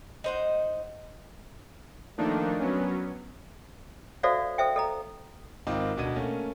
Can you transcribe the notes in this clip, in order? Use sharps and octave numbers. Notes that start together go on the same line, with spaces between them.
D#4 C5 F#5
D#3 F3 A3 A#3 D4 D#4
F#3 B3 C#4
F#4 A4 C5 D5 E5 F5
A4 C5 E5 G5
A4 D#5 A#5
G#1 C4 D#4 F4 D6
D1 B2 D4 D#5 G#6 D#7
A3 A#3 C#4